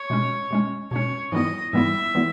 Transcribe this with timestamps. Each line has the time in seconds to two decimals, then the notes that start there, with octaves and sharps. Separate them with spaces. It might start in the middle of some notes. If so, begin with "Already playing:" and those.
Already playing: C#5
0.10 B2 G#3 C#4
0.51 B2 G#3 C#4
0.91 B2 G#3 C#4 C#5
1.32 G#2 E3 G3 B3 E4 D#5
1.73 G#2 E3 G3 B3 E4 E5
2.15 E3 G3 B3 E4